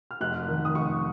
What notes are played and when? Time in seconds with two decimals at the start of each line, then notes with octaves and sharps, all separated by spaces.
0.11 F6
0.21 F1 F#6
0.48 D#3
0.65 D#6
0.75 F1 C#6